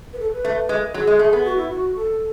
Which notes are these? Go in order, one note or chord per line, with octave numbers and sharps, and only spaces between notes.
B4
A4
B4
A3
G#3
F#3 G#4
G#3
A3
B3
F#4
E4
F#4
A4